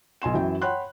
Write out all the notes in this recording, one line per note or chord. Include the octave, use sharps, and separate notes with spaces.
B1 G#5 C6 E7
F#2 E3 F#3 G5
C#5 F#5 G5 B5 C6 F#6